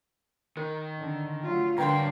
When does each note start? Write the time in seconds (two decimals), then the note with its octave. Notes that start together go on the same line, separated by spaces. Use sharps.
0.57 D#3 A#4
0.99 D3
1.42 F#3 A3 F4
1.78 G2 D3 F#3 D4 A#4 F5 G5 C6